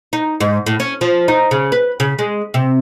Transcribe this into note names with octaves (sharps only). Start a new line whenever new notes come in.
D#4
G#2
A2
C#4
F3
D#4
C#3
B4
C#3
G#3
C3